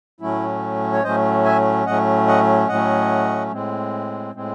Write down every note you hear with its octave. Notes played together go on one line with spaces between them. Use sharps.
A2 F#3 A3 C#4 E4
C#5
A2 F#3 A3 C#4 C5 D#5
E5 G#5
A2 F#3 A3 C#4 D#5 F#5
D#5 F#5
A2 F#3 A3 C#4 D#5 F#5
A2 G#3 C4
A2 G#3 C4